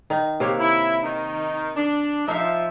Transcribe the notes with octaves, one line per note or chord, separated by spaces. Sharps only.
D#3 D#4
C3 A#3 C4 G4 A#4 C#5
E4
D#3 D#4
D4
F3 D#4 E5 F5